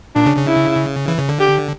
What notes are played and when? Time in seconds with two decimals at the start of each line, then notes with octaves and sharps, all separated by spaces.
0.15 A#2 D4
0.26 C#3
0.37 C#3
0.47 E4
1.08 E3
1.19 C#3
1.29 D3
1.40 G4